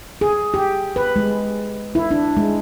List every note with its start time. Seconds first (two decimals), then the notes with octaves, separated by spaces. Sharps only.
0.21 G#4
0.54 G4
0.96 B4
1.16 G#3
1.95 E4
2.11 D4
2.37 G#3